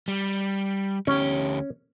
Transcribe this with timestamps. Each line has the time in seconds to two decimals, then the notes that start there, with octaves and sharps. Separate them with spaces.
0.08 G3
1.07 D2 C#4 G4